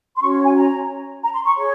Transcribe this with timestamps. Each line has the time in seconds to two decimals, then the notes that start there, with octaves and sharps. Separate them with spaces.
0.16 C6
0.21 C#4 F#4 C#5 C#6
0.44 G#5
0.56 A#5
1.23 A#5
1.34 C6
1.45 C#6
1.57 G#4 C#5